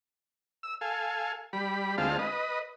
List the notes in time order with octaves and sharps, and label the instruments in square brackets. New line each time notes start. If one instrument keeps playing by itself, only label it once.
[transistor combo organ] E6
A4 F5 G#5
G3 B5
D2 G#3 C4 F4 F5 A5
B4 D#5